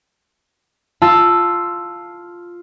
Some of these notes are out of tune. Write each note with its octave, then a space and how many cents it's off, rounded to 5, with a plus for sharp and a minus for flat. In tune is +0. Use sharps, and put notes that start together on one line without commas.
F4 +0 A5 +0 E6 +5